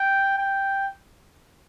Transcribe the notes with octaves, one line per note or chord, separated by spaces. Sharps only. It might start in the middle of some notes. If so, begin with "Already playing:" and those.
Already playing: G5
G5